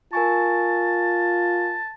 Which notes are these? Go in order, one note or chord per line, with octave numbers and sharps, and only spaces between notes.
F4 A#4 G#5 A5 C#6